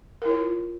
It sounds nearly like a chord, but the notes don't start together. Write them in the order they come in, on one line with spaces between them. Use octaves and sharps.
A#4 E4 C#5 F4